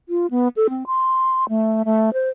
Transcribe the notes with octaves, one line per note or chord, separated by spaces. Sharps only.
F4
B3
A4
C4
C6
A3
A3
C5